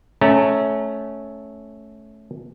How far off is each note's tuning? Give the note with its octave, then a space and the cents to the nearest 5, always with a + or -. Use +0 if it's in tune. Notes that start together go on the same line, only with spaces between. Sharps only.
A3 -15 C#4 +0 A#5 -30